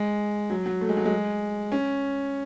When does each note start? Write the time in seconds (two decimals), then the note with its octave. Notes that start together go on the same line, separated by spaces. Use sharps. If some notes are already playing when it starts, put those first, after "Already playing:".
Already playing: G#3
0.50 F#3
0.66 F#3
0.81 A3
0.89 G#3
0.97 F#3
1.06 G#3
1.72 C#4